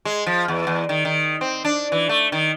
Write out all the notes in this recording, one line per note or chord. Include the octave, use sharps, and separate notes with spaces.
G#3
F3
E2
E2
D#3
D#3
C4
D4
E3
A3
D#3